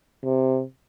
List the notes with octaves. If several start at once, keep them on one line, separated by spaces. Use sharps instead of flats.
C3